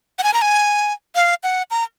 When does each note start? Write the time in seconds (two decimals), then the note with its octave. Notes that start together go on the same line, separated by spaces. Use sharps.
0.19 F#5
0.23 G#5
0.34 A#5
0.42 G#5
1.15 F5
1.43 F#5
1.71 A#5